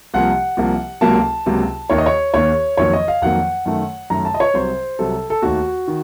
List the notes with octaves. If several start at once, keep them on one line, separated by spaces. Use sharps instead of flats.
C2 C3 F3 A#3 F#5
C2 C3 F3 A#3
C#2 C3 F#3 A#3 A5
C#2 C3 F#3 A#3
D#2 D#3 A#3 C#5
D#5
C#5
D#2 D#3 A#3 C#5
F2 D#3 F#3 A#3 C#5
D#5
F5
F2 D#3 F#3 A#3 F#5
F#2 D#3 A3
F#2 D#3 A3 A#5
A5
D#5
C#5
C2 C3 F#3 C5
C2 C3 F#3 A4
A4
D#2 D#3 A3 F#4
D#3